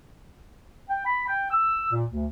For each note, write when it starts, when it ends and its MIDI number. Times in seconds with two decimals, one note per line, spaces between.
0.88 1.02 79
1.04 1.26 83
1.27 1.48 79
1.50 1.87 88
1.91 2.03 46
2.11 2.25 38